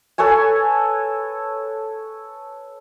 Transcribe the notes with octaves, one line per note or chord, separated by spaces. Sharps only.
A4 B4 C#5 G#5